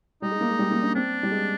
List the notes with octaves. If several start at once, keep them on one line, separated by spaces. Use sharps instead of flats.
G3 D#4
G#3
A#3
G#3
G3
A#3
D4
C4 D4
G3
G#3